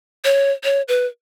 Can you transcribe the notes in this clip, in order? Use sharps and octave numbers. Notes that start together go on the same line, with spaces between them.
C#5
C#5
B4